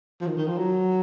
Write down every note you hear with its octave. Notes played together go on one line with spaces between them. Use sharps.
F3
D#3
D#3
F3
F#3